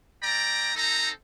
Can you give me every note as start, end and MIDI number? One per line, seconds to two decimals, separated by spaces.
0.23 0.73 57
0.23 0.73 74
0.23 0.73 79
0.23 0.73 82
0.75 1.10 60
0.75 1.10 63
0.75 1.10 69
0.75 1.10 82